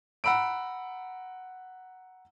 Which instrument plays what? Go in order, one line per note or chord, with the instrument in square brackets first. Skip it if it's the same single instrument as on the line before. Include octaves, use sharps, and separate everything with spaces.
[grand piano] F#5 A#5 B5 E6 D7